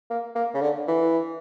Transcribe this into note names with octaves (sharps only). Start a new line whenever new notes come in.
A#3
A#3
C#3
D3
E3